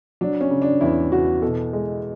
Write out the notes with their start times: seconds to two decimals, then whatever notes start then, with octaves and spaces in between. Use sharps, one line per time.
0.21 F#3 D4
0.41 C#4
0.51 C#3
0.62 D4
0.81 E2 E4
1.12 E2 F#4
1.42 B2 A4
1.73 G#3